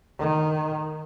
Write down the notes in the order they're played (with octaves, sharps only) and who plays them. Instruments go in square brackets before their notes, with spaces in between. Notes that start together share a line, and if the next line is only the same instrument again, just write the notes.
[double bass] D#3